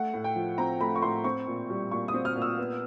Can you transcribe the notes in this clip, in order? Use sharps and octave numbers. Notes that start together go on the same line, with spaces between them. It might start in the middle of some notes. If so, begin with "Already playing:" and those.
Already playing: A3 F#5
A2
G5
F3
C4 A#5
A3 B5
C#6
A2 C6
C4 C#6
A#2
G3
A#2 C#6
D#6
C4
F6
A#2
E6
B3